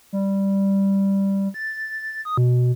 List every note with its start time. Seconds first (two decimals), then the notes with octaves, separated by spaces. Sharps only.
0.13 G3
1.54 A6
2.25 D#6
2.37 B2